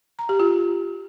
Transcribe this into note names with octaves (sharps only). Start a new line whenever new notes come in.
A#5
G4
F4